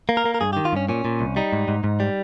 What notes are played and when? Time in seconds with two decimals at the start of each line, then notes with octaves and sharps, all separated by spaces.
0.09 A#3
0.17 A#4
0.25 A#3
0.34 A#4
0.41 G2 G#4
0.53 D#3 G4
0.65 F4
0.73 G2 C#4
0.89 A#2 C#4
1.05 A#2
1.21 C2
1.36 G3 D#4
1.53 G#2
1.68 G#2
1.84 G#2
2.00 G3